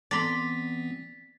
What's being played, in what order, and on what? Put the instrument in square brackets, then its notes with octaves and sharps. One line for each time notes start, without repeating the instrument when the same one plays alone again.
[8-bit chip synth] E3 B3 C4 [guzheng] D5 A#5 C6 [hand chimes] A6 B6